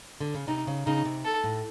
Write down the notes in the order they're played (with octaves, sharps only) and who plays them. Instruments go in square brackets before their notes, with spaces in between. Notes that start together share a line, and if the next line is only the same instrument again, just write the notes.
[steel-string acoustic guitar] D3
C#3
[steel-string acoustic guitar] C3 [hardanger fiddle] D#4
[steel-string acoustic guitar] C#3
[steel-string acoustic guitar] C#3 [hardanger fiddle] D#4
[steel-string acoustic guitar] C3
[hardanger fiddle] A4
[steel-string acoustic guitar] A2